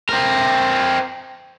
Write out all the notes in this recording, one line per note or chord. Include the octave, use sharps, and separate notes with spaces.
C4 A#4